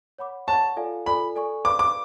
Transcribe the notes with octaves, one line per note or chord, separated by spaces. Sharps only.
C#5 F#5 B5 D6
C#5 F#5 A5 C#6
F4 A4 D5 F5 G#5
F4 A4 D5 G#5 B5
A4 D5 G#5 C#6
B4 D5 F5 B5 D6
D6